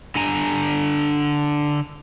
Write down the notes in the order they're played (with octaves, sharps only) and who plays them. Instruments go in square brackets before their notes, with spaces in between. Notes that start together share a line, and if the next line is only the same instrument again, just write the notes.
[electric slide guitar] D3 D4 G#5 A#5